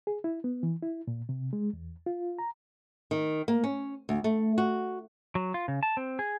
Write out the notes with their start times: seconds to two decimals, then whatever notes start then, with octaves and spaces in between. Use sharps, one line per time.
0.07 G#4
0.24 E4
0.44 B3
0.63 E3
0.82 E4
1.08 A#2
1.29 C3
1.53 G#3
1.73 E2
2.06 F4
2.39 A#5
3.11 D#3
3.48 A#3
3.64 C#4
4.09 D2
4.24 A3
4.58 F#4
5.35 F#3
5.54 F4
5.68 C#3
5.83 A5
5.97 C4
6.19 G#4